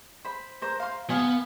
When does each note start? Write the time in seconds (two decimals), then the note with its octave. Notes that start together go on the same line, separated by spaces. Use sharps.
0.25 C5 B5
0.62 A#4 C5
0.80 F5 C6
1.10 B3 F5 G#5